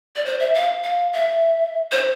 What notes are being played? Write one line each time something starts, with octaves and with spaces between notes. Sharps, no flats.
D5
C5
E5
F5
F5
E5
C5